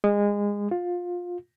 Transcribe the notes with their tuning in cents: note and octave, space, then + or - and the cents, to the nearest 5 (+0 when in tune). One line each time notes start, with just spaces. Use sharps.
G#3 -25
F4 +20